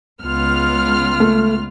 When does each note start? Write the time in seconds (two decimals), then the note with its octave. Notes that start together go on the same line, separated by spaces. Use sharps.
0.23 C#2 B3 F4 F6
1.20 A3